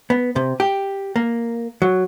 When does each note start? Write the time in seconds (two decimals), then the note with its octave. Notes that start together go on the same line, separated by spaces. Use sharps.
0.10 B3
0.36 C3
0.60 G4
1.16 A#3
1.82 F#3